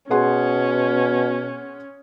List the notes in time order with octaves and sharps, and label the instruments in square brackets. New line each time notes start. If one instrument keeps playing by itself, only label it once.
[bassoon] B2 [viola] C#4 [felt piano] G#4 F#5 C6